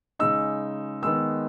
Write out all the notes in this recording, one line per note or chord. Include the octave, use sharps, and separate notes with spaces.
C#3 G#3 D#4 E6
D#3 G#3 B3 D#4 E6